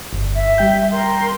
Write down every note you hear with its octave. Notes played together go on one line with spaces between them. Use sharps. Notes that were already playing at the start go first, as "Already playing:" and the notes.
G1
E5
G3 G5 G6
A#4 C6